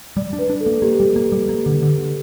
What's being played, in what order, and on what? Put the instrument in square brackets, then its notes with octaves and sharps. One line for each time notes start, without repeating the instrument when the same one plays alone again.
[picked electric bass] G3 [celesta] D5
[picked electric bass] D4
[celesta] B4
[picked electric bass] D4
[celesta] A4
[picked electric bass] A#3
[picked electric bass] A#3 [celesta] G4
[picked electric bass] G3
A#3
G3
A#3
D3
D3